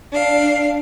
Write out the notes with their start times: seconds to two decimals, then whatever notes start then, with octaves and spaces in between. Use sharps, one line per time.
0.11 D4 F5